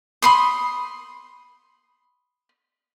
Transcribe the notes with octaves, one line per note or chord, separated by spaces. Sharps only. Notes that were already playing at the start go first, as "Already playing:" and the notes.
B5 C6 D#6